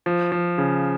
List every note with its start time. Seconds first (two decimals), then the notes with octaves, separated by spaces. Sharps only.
0.06 F3
0.32 F3
0.58 C#3